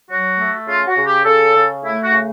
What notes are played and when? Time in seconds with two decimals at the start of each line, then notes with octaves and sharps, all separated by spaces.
0.11 F#3 F#4
0.39 A3
0.68 C#3 F4
0.88 F#4
0.97 C#3
1.07 G4
1.25 C#3 A4
1.55 C#3
1.84 A3 E4
2.03 F#4
2.12 C#3